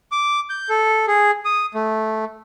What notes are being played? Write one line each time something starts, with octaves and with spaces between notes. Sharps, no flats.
D6
G6
A4
G#4
D#6
A3